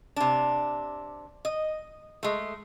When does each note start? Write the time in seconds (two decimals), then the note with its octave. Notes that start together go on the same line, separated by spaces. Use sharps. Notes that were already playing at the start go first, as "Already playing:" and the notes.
0.16 C3 D4
1.45 D#5
2.23 G#3 A3